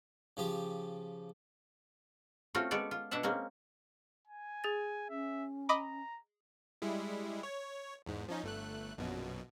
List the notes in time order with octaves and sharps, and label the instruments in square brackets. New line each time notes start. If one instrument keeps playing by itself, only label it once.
[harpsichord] C#3 F3 G4
[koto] A3 C4 C#4 F4 F#4 A4
G#3 B3 C#4 A4 C#5 D5
F4
B2 D4 E5 F#5 A5
G#3 A#3 C4 C#4
[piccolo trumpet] G#5
[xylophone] G#4 A6
[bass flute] C#4 [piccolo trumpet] E5
[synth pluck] D#5 B5 D6 [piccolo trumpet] A#5
[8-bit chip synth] G3 G#3 E4
C#5
E2 G#2
F3 C#4 D#4
G1 A3 F#6
A#1 F#2 B2